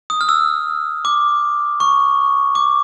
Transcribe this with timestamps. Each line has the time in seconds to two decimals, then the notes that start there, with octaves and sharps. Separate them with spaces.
0.10 D#6
0.21 F6
0.29 E6
1.05 D6
1.80 C#6
2.55 D6